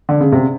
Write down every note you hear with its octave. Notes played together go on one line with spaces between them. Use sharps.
D3
C#3
C3